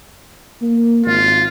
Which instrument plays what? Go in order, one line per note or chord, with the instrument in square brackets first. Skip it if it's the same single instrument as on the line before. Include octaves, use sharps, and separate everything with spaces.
[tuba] A#3
[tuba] G#1 [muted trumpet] F4